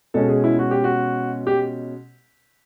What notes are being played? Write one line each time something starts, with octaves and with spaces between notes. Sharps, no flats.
B2 G#3 C#4 A4
G#4
E4
F#4
G4
F#4
G4